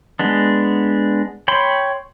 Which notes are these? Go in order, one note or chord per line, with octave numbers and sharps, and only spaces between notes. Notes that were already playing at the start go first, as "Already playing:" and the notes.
G#3 B3 D4
C#5 G5 B5 C6